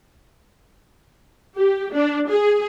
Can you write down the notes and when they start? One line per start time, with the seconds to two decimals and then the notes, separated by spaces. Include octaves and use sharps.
1.58 G4
1.94 D4
2.30 G#4